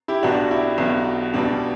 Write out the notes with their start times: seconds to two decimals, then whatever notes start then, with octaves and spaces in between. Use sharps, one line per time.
0.08 E4 G4
0.23 B1 B2 F#3 D4 F#4
0.43 F#4
0.51 E4 G4
0.78 B1 B2 F#3
1.34 C#2 B2 G3 D4